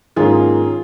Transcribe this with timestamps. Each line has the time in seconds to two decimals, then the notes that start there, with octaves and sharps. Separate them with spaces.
0.16 G#2 D#3 A#3 C#4 F4 G#4